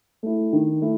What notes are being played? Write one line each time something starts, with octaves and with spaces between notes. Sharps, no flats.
A3 E4
D#3
A3 E4